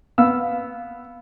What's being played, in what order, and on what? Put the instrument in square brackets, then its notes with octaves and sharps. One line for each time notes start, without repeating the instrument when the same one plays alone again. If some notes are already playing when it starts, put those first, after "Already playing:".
[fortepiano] B3 F5 E6